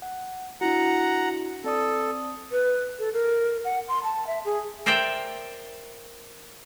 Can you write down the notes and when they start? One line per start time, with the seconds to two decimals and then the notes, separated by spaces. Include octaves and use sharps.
0.02 F#5
0.61 D4 E4 F#4 F#5 A#5
1.64 C4 A4 D5 D#6
2.52 B4
2.99 A4
3.13 A#4
3.65 F#5
3.88 C6
4.04 A5
4.27 E5
4.45 G#4
4.86 A#4 C5 D5 E5 G5